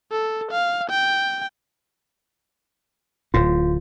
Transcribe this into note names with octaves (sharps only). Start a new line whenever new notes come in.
A4
F5
G5
D1 A2 F4